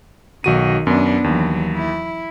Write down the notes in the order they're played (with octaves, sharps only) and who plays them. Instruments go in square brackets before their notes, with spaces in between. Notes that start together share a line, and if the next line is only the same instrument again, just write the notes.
[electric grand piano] B1 F#4 D#7 [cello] D#3
[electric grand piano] F#2 [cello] B3 D4
[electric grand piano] D#2 [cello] E3 F#3
[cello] E4